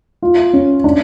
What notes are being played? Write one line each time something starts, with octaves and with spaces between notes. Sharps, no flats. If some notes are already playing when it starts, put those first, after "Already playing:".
F4
C#4
D4